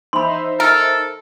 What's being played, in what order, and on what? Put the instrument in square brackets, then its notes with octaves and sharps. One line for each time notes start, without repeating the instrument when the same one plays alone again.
[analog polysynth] D#4 C5 E5 [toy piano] B5 C6
[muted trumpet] A4 [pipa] A#4